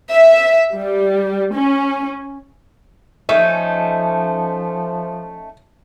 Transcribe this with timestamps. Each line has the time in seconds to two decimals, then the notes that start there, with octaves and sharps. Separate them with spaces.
0.11 E5
0.76 G3
1.54 C#4
3.29 F3 A3 C#4 D#4 E5